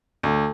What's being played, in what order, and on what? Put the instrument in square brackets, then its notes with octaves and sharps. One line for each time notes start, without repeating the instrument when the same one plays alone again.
[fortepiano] D2